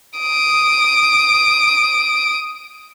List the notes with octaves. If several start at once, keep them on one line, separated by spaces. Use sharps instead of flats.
D#6 D7